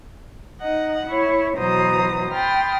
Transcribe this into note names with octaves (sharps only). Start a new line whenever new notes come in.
D#4 D#5 F#5
E4 C#5
B2 E3 F#3 C5 A#5 D#6
G5 B5 C6 D#6 F6 A6